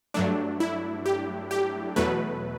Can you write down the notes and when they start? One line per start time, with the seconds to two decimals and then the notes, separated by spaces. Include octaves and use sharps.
0.14 G2 F#3 A3 D4
0.60 E4
1.06 G4
1.51 G4
1.96 E2 B2 F#3 A3 B4